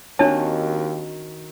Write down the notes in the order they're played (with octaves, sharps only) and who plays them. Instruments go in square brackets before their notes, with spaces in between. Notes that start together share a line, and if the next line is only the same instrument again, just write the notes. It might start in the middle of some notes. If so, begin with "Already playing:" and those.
[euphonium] D#2 [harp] D#3 C4 F#4 [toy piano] D4 A5 [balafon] C#5